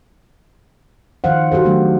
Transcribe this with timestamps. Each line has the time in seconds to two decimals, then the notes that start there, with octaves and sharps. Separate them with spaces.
1.24 D#3 F3 C5 F5 F#5
1.52 F#4 G4 A4 C5
1.64 D#3 F#3 A3 B3 D4